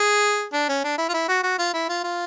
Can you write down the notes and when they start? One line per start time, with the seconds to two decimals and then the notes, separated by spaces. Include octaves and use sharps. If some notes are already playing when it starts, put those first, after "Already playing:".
Already playing: G#4
0.53 D4
0.69 C#4
0.84 D4
0.98 E4
1.09 F4
1.14 E4
1.29 F#4
1.44 F#4
1.59 F4
1.74 E4
1.89 F4
2.04 F4